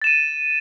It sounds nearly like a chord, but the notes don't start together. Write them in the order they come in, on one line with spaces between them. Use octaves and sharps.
A6 E7 D#7